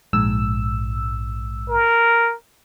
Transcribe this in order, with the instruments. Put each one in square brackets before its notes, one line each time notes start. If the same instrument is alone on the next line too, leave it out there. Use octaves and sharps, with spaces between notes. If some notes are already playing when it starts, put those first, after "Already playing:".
[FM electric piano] A#1 G#2 E6
[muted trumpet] A#4